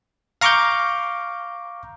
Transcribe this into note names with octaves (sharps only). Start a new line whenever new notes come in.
F5 A#5 C#6 D6 F6 G6